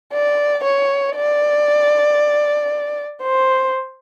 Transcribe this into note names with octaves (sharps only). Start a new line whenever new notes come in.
D5
C#5
D5
C5